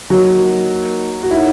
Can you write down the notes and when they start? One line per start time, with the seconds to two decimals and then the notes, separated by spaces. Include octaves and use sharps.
0.10 F#3 A#3 D#4 F#4 A#4 D#5 F#5
1.23 F#4
1.31 D#4 E4 A#4 C#5 F#5